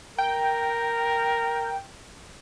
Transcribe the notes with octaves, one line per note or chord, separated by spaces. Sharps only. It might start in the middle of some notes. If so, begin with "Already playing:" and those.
A#4 G5